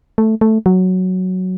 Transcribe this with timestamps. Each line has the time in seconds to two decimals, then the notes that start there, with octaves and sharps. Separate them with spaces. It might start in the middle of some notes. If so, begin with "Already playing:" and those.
0.18 A3
0.41 A3
0.66 F#3